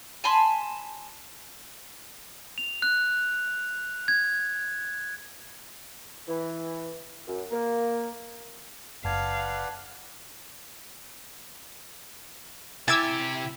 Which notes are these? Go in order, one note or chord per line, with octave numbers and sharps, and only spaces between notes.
G#5 A5 B5 C6
F7
F#6
G#6
E3
F#2
A#3
F#1 B4 D5 F5 F#5 A5 G#6
C3 E4 G4 G#5 D6 E6 G#6 A6